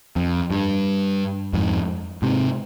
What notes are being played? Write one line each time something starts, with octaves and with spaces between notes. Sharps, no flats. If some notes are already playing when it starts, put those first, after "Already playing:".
F2
G2
F2 G#2
G#2 C3